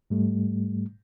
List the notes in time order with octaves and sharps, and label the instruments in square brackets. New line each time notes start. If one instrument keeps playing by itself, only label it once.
[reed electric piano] G#2 G3 A3